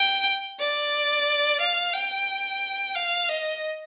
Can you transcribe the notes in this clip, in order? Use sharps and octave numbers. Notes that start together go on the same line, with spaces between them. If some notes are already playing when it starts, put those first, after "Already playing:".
Already playing: G5
D5
F5
G5
F5
D#5